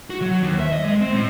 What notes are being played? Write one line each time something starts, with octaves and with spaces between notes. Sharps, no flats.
F#4
F#3
D#2
E5
D#5
G#3
C4
A2